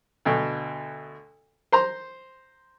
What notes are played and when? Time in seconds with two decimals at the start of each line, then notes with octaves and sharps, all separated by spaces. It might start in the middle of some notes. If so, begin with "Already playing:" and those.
0.25 D2 B2
1.72 C5 A#5 C6